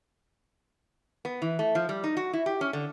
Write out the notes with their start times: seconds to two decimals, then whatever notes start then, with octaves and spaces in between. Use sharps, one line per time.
1.25 B3
1.42 E3
1.59 A3
1.75 F3
1.89 G3
2.04 D#4
2.17 F#4
2.33 E4
2.46 G4
2.61 C#4
2.73 D3